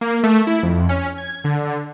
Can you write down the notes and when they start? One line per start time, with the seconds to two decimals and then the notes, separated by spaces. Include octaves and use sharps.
0.01 A#3
0.23 A3
0.47 E4
0.63 F2
0.89 C#4
1.18 G#6
1.44 D3